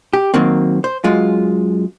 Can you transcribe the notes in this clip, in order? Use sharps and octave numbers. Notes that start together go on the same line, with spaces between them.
G4
D#3 F#3 A#3 C4
C5
F#2 G#3 F4